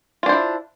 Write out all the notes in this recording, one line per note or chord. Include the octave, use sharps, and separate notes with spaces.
D4 E4 F4 C5